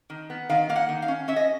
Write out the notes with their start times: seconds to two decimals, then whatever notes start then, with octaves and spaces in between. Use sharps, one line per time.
0.10 D#3
0.30 B3
0.49 D#3 F5
0.69 A#3 F5
0.76 F#5
0.89 D#3
1.02 F5
1.08 C#4
1.28 C#4 E5
1.36 D#5